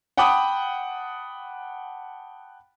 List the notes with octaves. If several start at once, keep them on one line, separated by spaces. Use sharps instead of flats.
F#5 G5 A5 B5 D6 D#6